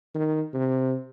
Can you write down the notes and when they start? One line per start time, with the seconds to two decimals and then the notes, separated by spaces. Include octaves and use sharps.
0.15 D#3
0.54 C3